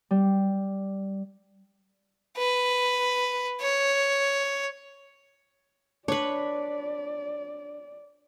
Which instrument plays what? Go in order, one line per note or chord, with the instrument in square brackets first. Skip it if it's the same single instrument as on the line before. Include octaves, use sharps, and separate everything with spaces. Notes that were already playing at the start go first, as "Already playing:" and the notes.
[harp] G3
[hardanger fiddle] B4
C#5
[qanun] D4 B4 [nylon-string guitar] C#5 [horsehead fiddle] D5